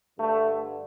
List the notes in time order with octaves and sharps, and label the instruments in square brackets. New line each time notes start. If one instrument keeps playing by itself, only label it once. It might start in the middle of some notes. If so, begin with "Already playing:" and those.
[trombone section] G2 D3 A3